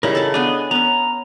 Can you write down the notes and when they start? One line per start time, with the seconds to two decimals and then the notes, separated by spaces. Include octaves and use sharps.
0.03 C#3 G3 D#4 E4 A#4
0.15 A4 A5
0.34 B3 D4 G#4 D#5
0.71 B3 C#4 A#5